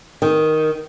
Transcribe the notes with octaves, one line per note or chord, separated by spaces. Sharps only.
D#3